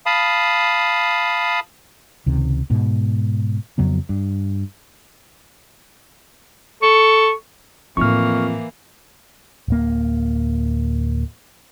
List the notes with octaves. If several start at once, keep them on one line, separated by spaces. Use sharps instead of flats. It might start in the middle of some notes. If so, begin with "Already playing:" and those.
F5 A5 B5 D#6
C#2 C3 D#3
G#2 B2
F2 C#3 F#3 B3
G2
A4 C#6
F2 A2 E3 A#3 D#4 C#6 F6
D1 A#3